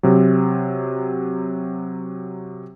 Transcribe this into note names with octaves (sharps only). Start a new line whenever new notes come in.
C3 F#3